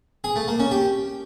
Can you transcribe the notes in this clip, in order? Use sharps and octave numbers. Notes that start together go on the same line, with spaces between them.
G#4
A3
A#3
C#4
G4